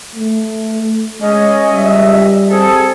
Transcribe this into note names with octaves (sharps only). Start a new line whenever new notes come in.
A3
G#3 C#4 D#5
C#2 G3 E5
C4 G#4 A4